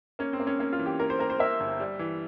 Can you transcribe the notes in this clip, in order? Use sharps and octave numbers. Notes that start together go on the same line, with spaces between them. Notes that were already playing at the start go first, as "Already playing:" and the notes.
A#3 C#4
C4
A#3
C#4
A#3 C#4
F4
E3
G4
A#3 A#4
C5
A#3 A#4
C5
A#3 E5
G1
G3
E3